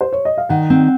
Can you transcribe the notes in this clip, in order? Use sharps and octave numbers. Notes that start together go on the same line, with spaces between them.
C5
C#5
D#5
F5
D#3 F#5
C4